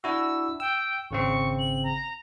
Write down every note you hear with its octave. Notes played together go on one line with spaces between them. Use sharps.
D4 E4 F#4 E6
G5 E6
G#1 C#3 C4 C#6
F#7
A#5